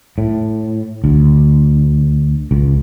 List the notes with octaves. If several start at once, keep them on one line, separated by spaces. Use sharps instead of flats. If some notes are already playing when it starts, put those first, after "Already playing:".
A2
D2
C#2